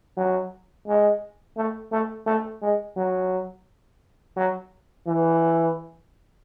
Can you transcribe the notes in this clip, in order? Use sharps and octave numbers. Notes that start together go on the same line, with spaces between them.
F#3
G#3
A3
A3
A3
G#3
F#3
F#3
E3